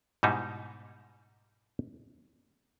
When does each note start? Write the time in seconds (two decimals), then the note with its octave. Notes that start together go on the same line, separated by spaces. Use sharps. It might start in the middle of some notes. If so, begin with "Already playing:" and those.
0.23 G#2 B2 G3 D#4 E4